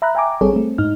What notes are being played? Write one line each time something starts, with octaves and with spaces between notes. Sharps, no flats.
E5 A#5 B5 F#6
E5 G5 G#5 A#5 D6
G#1 G3 C4 G#4 A4 C#5
A3 C4
G#2 D#4 F6